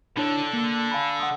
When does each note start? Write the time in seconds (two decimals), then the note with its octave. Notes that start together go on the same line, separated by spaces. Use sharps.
0.17 D3 D4 E4 A4 C#5
0.53 A#3
0.91 F5 G#5 B5
1.20 F#5 C6 D#6